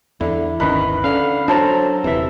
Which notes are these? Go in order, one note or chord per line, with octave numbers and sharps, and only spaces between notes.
E2 D3 E4
G1 D2 D#3 C#4 B4
D3 C#4 F5 F6
F#3 D4 A4 C5 A5 A#5
D#1 C3 E3 E5